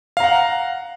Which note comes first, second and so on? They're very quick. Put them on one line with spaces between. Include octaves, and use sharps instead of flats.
F5 A#5 F#5